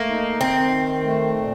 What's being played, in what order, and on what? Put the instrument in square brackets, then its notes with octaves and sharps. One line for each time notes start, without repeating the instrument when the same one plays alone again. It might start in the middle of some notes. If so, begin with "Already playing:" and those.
Already playing: [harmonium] A3 [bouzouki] A#3
[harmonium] D#4
[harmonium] D#3 [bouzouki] C4
[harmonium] D#3
A3
A#2